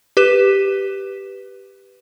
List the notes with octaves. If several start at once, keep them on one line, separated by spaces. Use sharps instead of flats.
G4 B4 B6 E7